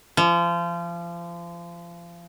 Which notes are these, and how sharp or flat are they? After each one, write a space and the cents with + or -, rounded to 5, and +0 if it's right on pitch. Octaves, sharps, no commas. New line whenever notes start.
F3 -30